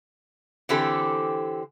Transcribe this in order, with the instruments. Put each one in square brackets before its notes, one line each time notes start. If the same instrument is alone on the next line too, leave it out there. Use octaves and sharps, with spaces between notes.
[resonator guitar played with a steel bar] D3 E3 C4 G4 A4